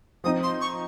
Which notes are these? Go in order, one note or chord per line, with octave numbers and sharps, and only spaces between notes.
F3 C4 D#4 D#6
C6
C#6